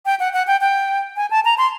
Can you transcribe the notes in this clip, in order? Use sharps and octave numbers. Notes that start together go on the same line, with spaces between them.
G5
F#5
F#5
G5
G5
G#5
A5
A#5
C6